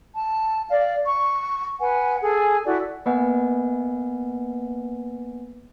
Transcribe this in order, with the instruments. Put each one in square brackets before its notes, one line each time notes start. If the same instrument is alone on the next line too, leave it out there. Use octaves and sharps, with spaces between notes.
[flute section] A5
D5 F5
C#6
B4 F#5 G#5
G#4 A4 G#5
E4 F#4 A4 D5
[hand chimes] A#3 B3 B4 D#5 F#5 G#5